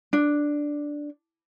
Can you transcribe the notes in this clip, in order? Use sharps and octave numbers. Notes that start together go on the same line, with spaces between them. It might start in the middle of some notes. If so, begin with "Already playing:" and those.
D4